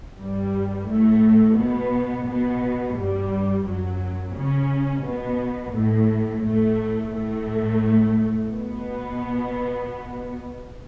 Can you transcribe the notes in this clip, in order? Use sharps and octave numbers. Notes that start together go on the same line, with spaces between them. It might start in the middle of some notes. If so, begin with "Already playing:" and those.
G2 G3
A2 A3
B2 B3
B2 B3
G2 G3
F#2 F#3
C#3 C#4
B2 B3
A2 A3
A2 A3
A2 A3
B2 B3